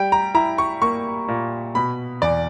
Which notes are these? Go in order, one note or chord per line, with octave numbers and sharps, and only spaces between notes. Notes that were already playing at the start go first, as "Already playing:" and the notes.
Already playing: G3 G5
A#5
E4 A#5
C#6
A#3 C#6
A#2
B2 B5
E2 D5